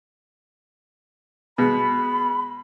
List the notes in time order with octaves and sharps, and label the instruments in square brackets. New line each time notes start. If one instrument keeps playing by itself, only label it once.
[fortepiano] B2 G#3 [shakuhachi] B5